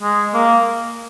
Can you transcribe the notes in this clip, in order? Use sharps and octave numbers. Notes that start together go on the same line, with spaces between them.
G#3
A#3